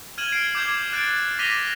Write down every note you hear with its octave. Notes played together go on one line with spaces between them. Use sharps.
F6 G#6 D#7 E7 F#7
G#6 C7 D7
D6 G6 G#6
F#6 A6 D7
D6 A#6 B6 D#7 F7 G7